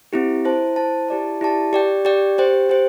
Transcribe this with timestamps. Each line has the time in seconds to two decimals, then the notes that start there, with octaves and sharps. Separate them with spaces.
0.13 C4 E4 G4
0.45 E4 C5 A5
0.76 E4 C5 A5
1.09 E4 G4 D5 A5
1.41 E4 G4 D5 A5
1.73 G4 D5 G5
2.05 G4 D5 G5
2.38 G4 C5 G5
2.69 G4 C5 G5